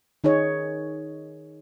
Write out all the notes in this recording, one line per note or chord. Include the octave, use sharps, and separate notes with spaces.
D#3 D#4 G#4 C#5